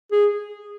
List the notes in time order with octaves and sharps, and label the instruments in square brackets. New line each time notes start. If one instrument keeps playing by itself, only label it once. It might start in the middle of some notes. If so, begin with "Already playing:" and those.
[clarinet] G#4